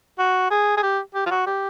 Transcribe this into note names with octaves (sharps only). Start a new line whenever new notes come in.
F#4
G#4
G#4
G4
G4
F4
F#4
G4